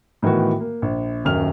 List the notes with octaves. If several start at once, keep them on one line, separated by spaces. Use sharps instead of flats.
A2 D#3 E3 B3 F#4
A#3
A#1
D#1 F#2 D#3 F6 F7